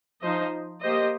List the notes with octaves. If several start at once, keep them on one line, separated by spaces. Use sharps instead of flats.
F3 D#4 C5 D#5
A#3 G4 C5 D#5